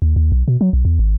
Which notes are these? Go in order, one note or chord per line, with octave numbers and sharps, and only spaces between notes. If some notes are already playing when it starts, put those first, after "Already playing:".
D#2
D#2
B1
B2
F#3
B1
E2
G#1